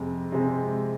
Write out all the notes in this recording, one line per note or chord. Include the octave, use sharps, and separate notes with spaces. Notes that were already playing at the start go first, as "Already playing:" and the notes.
Already playing: F2 C3 G#3
C3 G#3